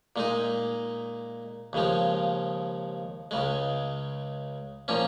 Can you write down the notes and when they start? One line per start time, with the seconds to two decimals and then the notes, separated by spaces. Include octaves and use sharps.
0.16 A#2 G#3 D#4
1.73 D#2 C#3 F3 G#3
3.31 C#2 C#3 G#3
4.88 A#2 F3 A#3 C#4